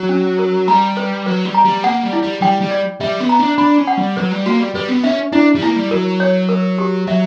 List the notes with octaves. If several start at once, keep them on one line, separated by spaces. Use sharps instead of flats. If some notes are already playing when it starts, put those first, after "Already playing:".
Already playing: F#3
C#4
A#4
G3 A#5
B4
F#3 B4
G3
A#5
G3
A#3 F#5
G3
E4
G3
G3 G5
G3
D5
G3 E5
B3
A#5
D4
D4 B5
C#4
F#5
G3
F#3 B4
G3
A#3 F#4
G3
G3 B4
B3
C#4 E5
D4 E4
G3
A#3 E4
G3
F#3 A#4
C#5
A#4
G4
F#3 E5